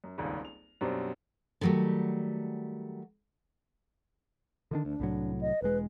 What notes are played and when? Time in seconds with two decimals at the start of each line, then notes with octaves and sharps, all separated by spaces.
0.04 F#2
0.18 D#1 G#1 C#2 G#2
0.45 F7
0.81 F#2 B2 G3 C4 D4
1.61 D3 D#3 F#3 G3 A3
4.71 D3 D#3 D4
4.85 D2 D4
5.00 C2 A2 F#3
5.41 D#5
5.62 E1 G#3 B4